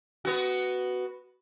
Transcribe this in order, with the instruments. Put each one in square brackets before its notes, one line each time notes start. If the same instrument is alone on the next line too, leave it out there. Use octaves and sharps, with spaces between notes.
[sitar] B3 F#4